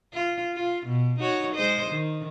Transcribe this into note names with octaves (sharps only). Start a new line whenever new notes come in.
F4
F4
B2
D#4 F#4 C#5
G#3 C5 D#5
D#3